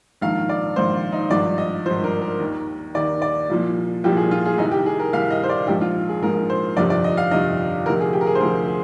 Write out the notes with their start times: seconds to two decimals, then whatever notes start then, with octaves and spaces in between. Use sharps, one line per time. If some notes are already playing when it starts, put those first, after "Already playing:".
0.21 A#1 G#2 D#3 F5
0.49 D5
0.76 A#1 G#2 D#3 C5
1.12 D#4
1.30 G#1 G2 F3 D5
1.58 D#5
1.86 G#1 G2 F3 C5
2.04 A#4
2.22 A#4
2.40 D#2
2.45 D#3
2.95 D#2 D#3 D5
3.22 D5
3.49 C2 A#2 F3
4.04 C2 A#2 F3 G4
4.17 G#4
4.31 F4
4.45 G#4
4.58 C2 C3 D#3 D#4
4.71 G4
4.86 G#4
4.99 A#4
5.13 C2 C3 D#3 F5
5.31 D#5
5.44 C5
5.49 D5
5.67 A#1 G#2 F3 G4
5.81 F4
6.09 G#4
6.22 A#1 G#2 F3 A#4
6.50 C5
6.76 G1 F2 C3 F3 D5
6.90 D5
7.04 D#5
7.17 F5
7.31 G1 F2 C3 F3 D#5
7.86 D2 C3 F3 A#4
8.00 G#4
8.13 G4
8.21 A#4
8.27 G#4
8.35 C5
8.40 D2 C3 F3 A#4
8.68 G#4